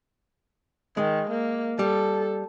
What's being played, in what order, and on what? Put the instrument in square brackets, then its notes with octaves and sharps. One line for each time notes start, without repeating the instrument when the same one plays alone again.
[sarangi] D#3 [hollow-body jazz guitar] G#3
[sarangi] A#3
[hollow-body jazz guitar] G3 [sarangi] A4